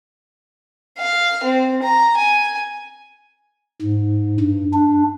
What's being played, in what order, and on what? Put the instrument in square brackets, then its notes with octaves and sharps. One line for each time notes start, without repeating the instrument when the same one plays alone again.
[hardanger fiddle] F5
C4
A#5
G#5
[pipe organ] G#2
G2
D4